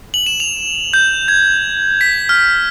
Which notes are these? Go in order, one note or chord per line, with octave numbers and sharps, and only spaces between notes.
F#7
E7
F7
G6
G#6
B6
F6